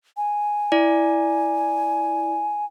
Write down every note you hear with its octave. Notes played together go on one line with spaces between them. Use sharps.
G#5
E4 D5